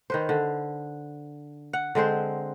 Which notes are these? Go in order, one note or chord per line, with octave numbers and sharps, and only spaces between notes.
D#3 B4 C5
D3
F#5
D3 G#3 C4 C5